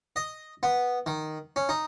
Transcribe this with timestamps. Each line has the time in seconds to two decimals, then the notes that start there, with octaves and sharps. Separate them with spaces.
0.16 D#5
0.63 B3
1.06 D#3
1.56 C#4
1.69 D#4